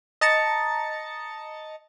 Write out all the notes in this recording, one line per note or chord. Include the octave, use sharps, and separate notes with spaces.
D#5 A5 A#5 A6 C#7